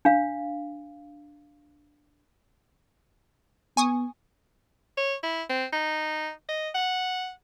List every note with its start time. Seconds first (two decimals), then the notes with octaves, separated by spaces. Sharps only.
0.05 D4 F5
3.77 B3 G#5 C#6 D#6
4.98 C#5
5.23 E4
5.49 C4
5.73 D#4
6.49 D#5
6.74 F#5